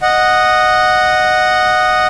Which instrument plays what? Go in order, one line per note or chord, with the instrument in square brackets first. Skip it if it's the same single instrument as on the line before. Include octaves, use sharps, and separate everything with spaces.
[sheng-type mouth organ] D#5 F#5